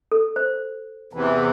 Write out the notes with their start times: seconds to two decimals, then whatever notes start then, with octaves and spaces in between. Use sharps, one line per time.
0.12 A4
0.36 C5
1.13 E2 C3 E3